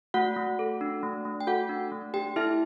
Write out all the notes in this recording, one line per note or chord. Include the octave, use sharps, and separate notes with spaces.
A3 F#4 F#5
A3
A4
D4
A3
A3
G5
F#4 A4 F#5
D4
A3
A3 G4 G5
E4 A4 E5